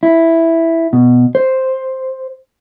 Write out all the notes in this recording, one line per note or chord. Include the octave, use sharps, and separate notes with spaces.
E4
B2
C5